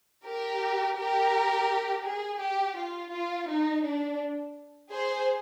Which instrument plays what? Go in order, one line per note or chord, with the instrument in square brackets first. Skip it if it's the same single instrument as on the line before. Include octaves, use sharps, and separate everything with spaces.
[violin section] G4 A#4
G4 A#4
G#4
G4
F4
F4
D#4
D4
G#4 C5